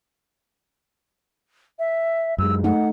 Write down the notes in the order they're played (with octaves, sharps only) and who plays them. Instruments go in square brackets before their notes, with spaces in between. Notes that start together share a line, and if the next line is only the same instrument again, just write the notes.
[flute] E5
[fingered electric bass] F#2 G#3 [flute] E6
[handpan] A3 D#4 [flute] F#5